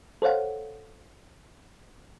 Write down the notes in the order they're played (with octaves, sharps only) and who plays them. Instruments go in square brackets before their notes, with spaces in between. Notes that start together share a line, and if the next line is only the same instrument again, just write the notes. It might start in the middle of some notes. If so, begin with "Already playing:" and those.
[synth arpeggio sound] A4 C5 C#5 F5 F#5